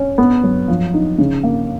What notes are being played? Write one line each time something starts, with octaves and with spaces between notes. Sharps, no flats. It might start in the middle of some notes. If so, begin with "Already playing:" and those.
Already playing: C#4
B3
F#3
F3
D#4
C#3
A#3